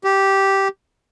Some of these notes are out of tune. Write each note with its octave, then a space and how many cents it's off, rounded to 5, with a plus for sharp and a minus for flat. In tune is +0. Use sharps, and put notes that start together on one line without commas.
G4 -10